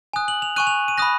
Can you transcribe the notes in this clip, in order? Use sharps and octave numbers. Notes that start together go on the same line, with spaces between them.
G#5 D#6 F#6
F#7
F7
G#5 C#6 F#6 D#7
F7
D#7
B5 D#6 F#6 A#6